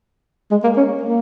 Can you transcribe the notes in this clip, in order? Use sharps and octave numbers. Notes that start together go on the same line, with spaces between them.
G#3
A#3
C#4
A#3